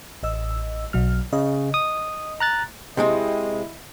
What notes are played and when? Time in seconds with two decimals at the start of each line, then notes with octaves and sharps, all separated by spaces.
0.23 A1 D#5 E6
0.93 B1 F#3 F6
1.33 C#3 D#5
1.74 D#6
2.40 A#5 F#6 A6
2.97 C3 G#3 C4 E4 D#5